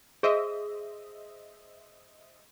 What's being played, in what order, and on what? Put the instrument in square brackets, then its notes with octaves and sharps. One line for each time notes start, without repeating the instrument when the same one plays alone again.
[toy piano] G#4 [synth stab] C5 D#5 E5